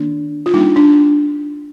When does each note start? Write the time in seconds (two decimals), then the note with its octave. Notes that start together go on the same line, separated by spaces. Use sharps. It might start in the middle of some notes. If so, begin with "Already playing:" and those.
Already playing: D#3 A#3 D4
0.46 F4
0.54 G3 A#3 D4 D#4
0.76 D4